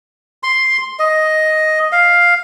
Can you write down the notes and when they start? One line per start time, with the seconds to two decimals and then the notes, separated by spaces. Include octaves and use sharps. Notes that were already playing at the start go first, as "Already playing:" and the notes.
0.43 C6
0.99 D#5
1.92 F5